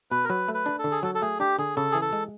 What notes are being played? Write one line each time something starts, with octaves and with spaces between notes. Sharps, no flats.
B2 B4
A#4
F#3 B4
A3
B4
D4
A4
D3
G#4
F#3 A4
A4
A3 G#4
D4 G4
D3 G#4
C#3 A4
E3 G#4
A4
G#3